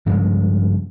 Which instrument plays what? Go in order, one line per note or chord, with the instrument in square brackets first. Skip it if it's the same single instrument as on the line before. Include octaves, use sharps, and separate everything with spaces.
[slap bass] G2 C#3 F3 G#3